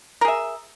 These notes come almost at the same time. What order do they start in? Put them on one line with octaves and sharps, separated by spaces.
A#4 G#4 E5